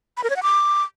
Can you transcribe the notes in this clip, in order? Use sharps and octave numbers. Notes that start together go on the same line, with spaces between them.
B5
A#4
C#5
F#5
D6